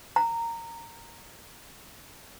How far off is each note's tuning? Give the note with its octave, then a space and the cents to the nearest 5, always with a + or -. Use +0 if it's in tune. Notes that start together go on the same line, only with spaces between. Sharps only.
A#5 -15